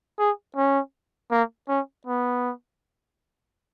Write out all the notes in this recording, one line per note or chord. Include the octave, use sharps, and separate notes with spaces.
G#4
C#4
A#3
C#4
B3